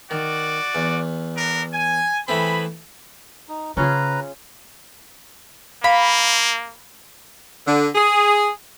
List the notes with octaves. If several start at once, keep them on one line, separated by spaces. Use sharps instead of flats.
D#3 F#4 D5
E2
B3 D4 A#4
G#5
E3 A3 C4 G#4 B5
D#4
C#3 C#4 F4 G#4 B4 A#5
A#3 F5 B5
D3
G#4